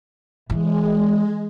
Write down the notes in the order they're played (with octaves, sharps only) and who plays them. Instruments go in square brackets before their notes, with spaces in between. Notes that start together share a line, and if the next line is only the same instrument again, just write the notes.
[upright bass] E3 [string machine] G#3